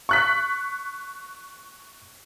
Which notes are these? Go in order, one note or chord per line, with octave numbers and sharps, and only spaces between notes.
C#6 F#6 B6